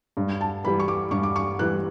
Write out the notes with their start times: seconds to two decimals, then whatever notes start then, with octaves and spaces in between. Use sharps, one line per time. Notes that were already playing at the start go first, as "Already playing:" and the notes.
0.17 G2
0.41 A5
0.64 E3 G3 B5
0.79 C#6
0.88 D6
1.11 G2 C#6
1.23 D6
1.36 C#6
1.59 E3 G3 F#6